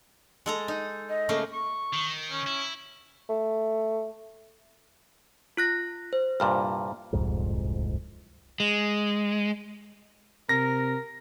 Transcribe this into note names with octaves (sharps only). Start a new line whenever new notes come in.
G#3 A4 A#5
D#4
D#5
C#3 A3 A#3
C#6
D#3
C#4
E4
A3
F4 F#6 A#6
C5
C2 G2 A#2 F6
D1 C2 F2 G#2
G#3
C3 A#4 A#6